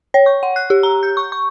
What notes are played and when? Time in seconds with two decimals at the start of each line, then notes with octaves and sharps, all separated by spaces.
0.14 C#5
0.26 C#6
0.43 F#5
0.56 F#6
0.70 G4
0.83 A#5
1.03 G6
1.17 C#6
1.32 C#6